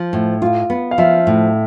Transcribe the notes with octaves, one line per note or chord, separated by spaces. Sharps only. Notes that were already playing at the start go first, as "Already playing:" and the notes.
Already playing: F3
A2
F4
B3
F5
F3 E5
A2